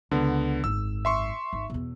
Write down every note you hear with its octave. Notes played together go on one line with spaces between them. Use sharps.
C#2 D3 B3
G#1 F#2 E6
E5 C6 C#6
G#1
E2 B2